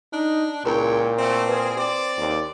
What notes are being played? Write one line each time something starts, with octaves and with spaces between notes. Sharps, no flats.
D4 D#4
C#2 A#2 E4 A#4 C#5 G5 A#5
A3 C4
G3 G#3 G#4 B4
C4 G4 D5
D#2